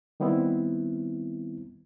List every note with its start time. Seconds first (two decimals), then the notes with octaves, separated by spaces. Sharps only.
0.20 D#3 G3 B3 C4 E4